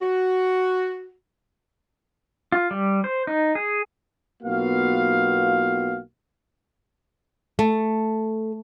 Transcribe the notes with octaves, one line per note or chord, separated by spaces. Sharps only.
F#4
F4
G3
C5
D#4
G#4
B1 A#3 B3 F4 F#4 F5
A3